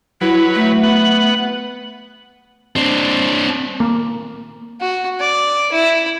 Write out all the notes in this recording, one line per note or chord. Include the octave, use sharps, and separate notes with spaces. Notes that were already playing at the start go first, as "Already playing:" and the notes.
F#3 E4 B4
A3
B3 F#5
C4 D4
A#3
F#4
D5
E4